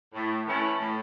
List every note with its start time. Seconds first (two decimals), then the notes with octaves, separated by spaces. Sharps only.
0.14 A2
0.47 E3 A3 C#4 E4
0.79 A2